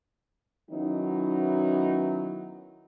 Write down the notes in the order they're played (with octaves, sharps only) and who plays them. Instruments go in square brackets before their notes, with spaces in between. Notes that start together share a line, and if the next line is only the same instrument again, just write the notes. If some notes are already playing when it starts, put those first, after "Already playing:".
[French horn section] D#3 F#3 B3 C#4 D#4 E4